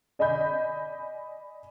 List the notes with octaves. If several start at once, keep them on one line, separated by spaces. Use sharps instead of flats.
D5 D#5 G#5 B5 G6